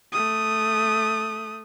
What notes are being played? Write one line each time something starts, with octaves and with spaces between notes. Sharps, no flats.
A3 D#6